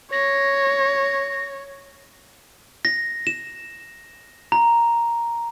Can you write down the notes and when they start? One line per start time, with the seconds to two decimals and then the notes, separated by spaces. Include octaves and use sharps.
0.12 C#5 A#6
2.85 A#6
3.27 E7
4.52 A#5